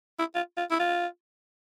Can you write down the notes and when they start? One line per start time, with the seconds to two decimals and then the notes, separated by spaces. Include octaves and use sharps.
0.19 E4
0.35 F4
0.57 F4
0.71 E4
0.79 F4